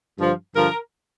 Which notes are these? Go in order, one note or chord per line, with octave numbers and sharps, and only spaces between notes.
G2 D3 F3
G2 D3 F3 A#4